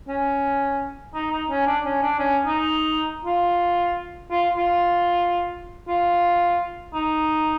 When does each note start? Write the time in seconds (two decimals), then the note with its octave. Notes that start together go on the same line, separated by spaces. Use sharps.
0.08 C#4
1.15 D#4
1.32 D#4
1.50 C#4
1.67 D4
1.85 C#4
2.02 D4
2.19 C#4
2.46 D#4
3.25 F4
4.31 F4
4.57 F4
5.88 F4
6.94 D#4